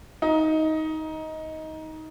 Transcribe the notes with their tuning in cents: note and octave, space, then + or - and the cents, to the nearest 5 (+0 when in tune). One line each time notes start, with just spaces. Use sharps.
D#4 +15